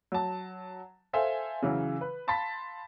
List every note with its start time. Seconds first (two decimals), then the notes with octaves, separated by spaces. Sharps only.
0.12 F#3 A5
1.13 A4 C5 E5 F5 G#5
1.62 C#3 E3 F#3
2.01 B4
2.27 F5 A5 B5 C6 A6 B6